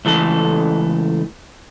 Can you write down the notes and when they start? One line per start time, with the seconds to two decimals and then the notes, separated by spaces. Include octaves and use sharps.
0.05 C#2 E3 A3 A4